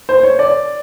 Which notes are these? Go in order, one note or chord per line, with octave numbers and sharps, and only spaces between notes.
C5
C#5
D5